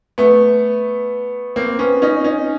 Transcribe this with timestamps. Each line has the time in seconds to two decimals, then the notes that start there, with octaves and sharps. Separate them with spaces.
0.18 A3 B3
1.56 A#3 C4
1.79 B3 C#4
2.02 C#4 D#4
2.24 C#4 D#4